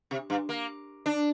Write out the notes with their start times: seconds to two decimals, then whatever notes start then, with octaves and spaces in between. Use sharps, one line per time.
0.11 C3
0.30 G2
0.49 A#3
1.06 D4